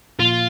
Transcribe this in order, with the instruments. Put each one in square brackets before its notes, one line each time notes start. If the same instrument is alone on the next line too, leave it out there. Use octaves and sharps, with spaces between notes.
[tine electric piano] A#2 F3 A#3 [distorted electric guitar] F4